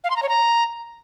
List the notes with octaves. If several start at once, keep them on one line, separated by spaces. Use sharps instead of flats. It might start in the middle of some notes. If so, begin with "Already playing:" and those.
F5
C6
A#5
C#5
A#5